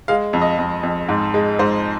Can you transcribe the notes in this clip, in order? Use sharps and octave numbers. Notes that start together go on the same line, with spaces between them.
G#3 F5
F2
D#5
F2
F2
G#2
G#3
G#2 C5